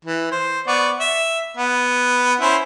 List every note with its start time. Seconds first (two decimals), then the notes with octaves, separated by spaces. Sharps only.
0.05 E3
0.32 C5
0.67 B3 D5 C#6
1.00 E5
1.57 B3
2.40 C#4 E4 C5